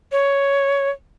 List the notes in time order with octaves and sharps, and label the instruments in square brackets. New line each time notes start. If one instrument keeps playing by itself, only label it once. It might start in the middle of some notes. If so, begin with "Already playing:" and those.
[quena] C#5